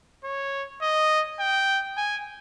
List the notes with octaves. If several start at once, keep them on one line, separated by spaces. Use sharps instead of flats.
C#5
D#5
G5
G#5